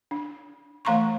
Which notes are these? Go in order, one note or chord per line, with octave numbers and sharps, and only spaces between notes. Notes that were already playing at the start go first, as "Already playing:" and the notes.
D4
E3 A3 F5 A#5 C6 C#6